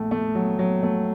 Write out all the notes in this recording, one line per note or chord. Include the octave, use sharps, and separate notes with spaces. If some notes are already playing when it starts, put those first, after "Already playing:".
Already playing: A#1 A3
A3
F#3
F#3
A3